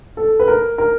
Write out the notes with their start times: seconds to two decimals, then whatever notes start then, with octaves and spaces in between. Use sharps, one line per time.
0.17 A4
0.39 B4
0.48 A#4
0.78 A#4